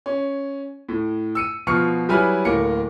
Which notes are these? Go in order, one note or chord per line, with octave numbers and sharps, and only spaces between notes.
C#4
A2
E6 C#7 D#7
B2 F3 C#6 F6 C#7
F#3 G3 E4 B4 G#5 F6
D1 A2 A#3 A#4 C#7